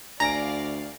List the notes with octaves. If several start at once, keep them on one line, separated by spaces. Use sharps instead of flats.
D2 D5 F5 G#5 A#5 A#6 D7